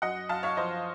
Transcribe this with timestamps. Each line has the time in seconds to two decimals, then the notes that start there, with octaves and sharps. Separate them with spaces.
0.02 F#2 D#5 F#5
0.29 F#2 F5 A5
0.43 C#5 F5
0.57 F3 C5 D#5